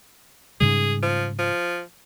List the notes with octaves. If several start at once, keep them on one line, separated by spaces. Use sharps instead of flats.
G#2 C#3 G3 G#4
F3
F3